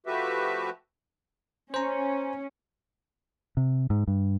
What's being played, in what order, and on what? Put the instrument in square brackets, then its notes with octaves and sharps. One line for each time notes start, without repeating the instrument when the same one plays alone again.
[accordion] F3 A3 F#4 G4 B4 E5
[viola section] C#4 [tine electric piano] C5 A#5
[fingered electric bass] C3
G#2
G2